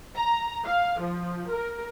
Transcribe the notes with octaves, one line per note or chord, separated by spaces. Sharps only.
A#5
F5
F3
A#4